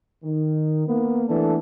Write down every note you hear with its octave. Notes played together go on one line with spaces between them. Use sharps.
D#3
A#3 B3
E3 A3 B3 D4 A4